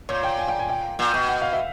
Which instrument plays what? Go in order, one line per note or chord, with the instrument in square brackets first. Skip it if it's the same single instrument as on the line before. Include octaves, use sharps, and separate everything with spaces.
[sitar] A#2 [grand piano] C#5
[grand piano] G5
G#5
G5
G#5
G5
[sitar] A#2
B2
[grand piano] F#5
F5
E5